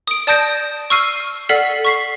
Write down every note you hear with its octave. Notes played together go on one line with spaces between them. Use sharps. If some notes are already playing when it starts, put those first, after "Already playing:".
D#6 D7
D5 A5 D#6 G6 A#6 D7
C#6 E6 F6 C7 D#7
A4 D5 F#5 F6 B6 C7
C#6 B6 C7